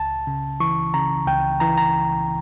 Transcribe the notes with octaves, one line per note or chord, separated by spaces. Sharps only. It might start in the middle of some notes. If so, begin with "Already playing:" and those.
Already playing: C#2 A5
C#3
E3 C#6
C#3 A#5
C#2 G5
E3 A#5
A#5